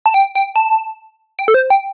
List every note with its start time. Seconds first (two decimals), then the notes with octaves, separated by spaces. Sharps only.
0.06 A5
0.14 G5
0.35 G5
0.56 A5
1.39 G5
1.48 A4
1.54 C5
1.70 G5